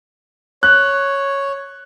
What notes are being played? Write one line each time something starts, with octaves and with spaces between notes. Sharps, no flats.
C#5 F#6